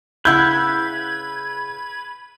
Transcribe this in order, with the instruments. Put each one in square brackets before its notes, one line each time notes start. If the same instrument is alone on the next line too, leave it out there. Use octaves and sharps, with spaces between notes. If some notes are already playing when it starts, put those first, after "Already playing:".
[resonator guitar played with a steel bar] C#3 E4 F#5 [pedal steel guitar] B4 [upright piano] E6 G6 [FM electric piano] G#6